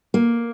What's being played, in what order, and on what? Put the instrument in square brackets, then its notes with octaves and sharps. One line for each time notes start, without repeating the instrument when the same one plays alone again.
[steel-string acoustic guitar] A#3